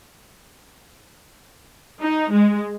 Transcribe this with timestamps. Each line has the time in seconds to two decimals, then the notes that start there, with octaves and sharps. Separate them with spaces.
2.02 D#4
2.31 G#3